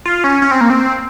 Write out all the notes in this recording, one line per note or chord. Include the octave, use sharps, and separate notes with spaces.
F4
C#4
C#4
C4
A#3
C4